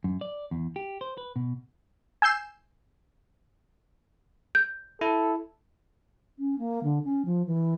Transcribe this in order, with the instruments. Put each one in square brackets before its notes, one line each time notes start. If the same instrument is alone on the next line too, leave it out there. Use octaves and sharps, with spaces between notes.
[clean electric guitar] F#2
D5
E2
G4
C5
B4
B2
[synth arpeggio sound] G#5 E6 G6 C7 E7
[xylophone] G6
[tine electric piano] E4 [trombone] A4
[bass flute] C#4
A#3
D3
C#4
F3
E3